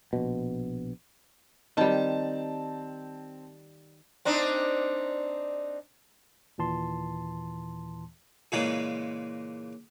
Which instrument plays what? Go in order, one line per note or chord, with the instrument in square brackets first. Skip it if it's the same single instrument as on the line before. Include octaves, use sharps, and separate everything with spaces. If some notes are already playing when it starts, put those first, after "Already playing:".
[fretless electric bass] A#1 B2
[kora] D#3 G3 [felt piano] C4 A5
[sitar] C4 D4 D#4
[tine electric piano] D#2 A#2 E3 A5 C6
[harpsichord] A#2 C#3 E3 G#3 A#3